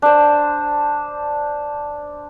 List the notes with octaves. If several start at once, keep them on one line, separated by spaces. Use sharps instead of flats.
D4 C5